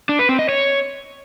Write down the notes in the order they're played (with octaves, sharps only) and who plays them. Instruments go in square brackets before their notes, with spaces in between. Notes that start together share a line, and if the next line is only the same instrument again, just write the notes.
[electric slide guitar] D4
B4
C4
D#5
C#5